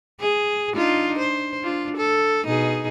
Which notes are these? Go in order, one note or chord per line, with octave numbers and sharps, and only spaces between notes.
G#4
D4 D#4 F4
C5
D4 F4
A4
B2 D#4 G#4